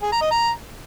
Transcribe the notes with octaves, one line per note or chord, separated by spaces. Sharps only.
G#4
A#5
D#5
A#5